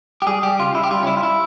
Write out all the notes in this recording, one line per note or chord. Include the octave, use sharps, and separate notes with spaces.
G4
G3 G#4
G3 G4
C#3 F4
C#3 E4
G4
G3 F4
C#4
G3 E4
F4
G3 E4